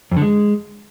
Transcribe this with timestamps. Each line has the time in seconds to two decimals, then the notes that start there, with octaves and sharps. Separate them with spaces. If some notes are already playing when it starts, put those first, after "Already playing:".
0.12 F2
0.17 D3
0.22 G#3